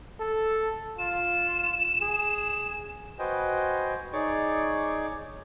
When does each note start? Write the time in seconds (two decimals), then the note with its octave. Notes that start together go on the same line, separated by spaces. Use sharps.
0.20 A4
0.99 F4 E7
2.02 G#4
3.19 F#4 B4 C5 D#5 G5 G#5
4.13 D#4 G#4 C#5 D5 C#6 D6